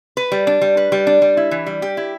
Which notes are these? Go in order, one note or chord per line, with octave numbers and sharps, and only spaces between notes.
B4
G3
D4
G3
B4
G3
D4
G3
E4
E3
G3
G4
E4